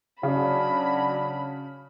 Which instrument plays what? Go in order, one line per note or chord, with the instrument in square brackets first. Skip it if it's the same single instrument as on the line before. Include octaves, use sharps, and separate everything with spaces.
[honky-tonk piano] C#3 [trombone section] F#3 D4 [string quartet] B5